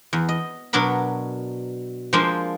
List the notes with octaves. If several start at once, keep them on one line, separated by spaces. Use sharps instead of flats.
E2
D#5
B2 F#3 D4 A#4 B5
F3 G#3 A#3 D4 F4 C5